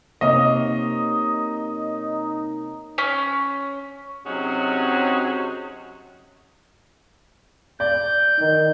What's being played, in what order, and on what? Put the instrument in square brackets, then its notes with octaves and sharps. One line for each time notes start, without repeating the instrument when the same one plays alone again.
[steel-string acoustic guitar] C3 A#3 C#5 [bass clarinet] D#4 [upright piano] D#5
[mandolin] C#4
[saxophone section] C3 F#3 C#4 D#4 F#4 G#4
[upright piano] D5 [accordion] G6
[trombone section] D#3